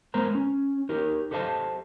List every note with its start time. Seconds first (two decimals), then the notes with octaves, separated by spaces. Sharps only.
0.14 G#3 B3 A#4 C5 A#5
0.35 C#4
0.89 D#4 G4 A#4
1.31 G4 A4 C5 D#5 F5 A5